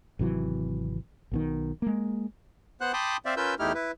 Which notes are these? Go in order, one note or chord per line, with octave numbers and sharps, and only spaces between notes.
G#1 C3 E3 F#3
B1 B2 D#3
G#3 A#3
B3 C5 F#5 F#6
G5 A5 B5 C6 D6 D#6
C4 C5 D5 E5 F5
C#4 F4 A#4 B4 E6 G6
E2 A3 D#4 E4 G4 F6
E4 B4